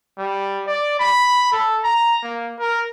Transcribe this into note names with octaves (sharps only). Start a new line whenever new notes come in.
G3
D5
B5
A4
A#5
A#3
A#4